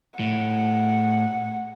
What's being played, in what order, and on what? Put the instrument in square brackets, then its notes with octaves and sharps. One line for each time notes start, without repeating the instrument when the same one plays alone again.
[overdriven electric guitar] A2 [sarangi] F#5